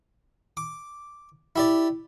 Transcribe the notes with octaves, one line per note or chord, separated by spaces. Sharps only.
D6
E4 G4 D5